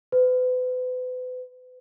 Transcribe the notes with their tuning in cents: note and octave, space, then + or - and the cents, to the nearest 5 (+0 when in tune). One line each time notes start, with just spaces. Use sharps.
B4 +40